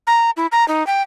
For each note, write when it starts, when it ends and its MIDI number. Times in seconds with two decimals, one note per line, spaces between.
0.07 0.30 82
0.37 0.47 64
0.52 0.66 82
0.68 0.86 63
0.87 1.02 79